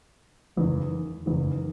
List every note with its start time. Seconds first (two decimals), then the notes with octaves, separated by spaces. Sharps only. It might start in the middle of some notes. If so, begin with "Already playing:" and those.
0.56 F#1 E2 D#3
1.26 F#1 E2 D#3